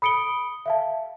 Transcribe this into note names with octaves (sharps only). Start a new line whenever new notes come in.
B5 D#6 C#7 D7 G7
E5 F5 A5